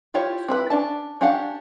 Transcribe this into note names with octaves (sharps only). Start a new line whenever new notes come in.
E4 F4 G4 C5 C#5
C4 E4 B4
C#4 D4 A5
C#4 D4 G4 F5 F#5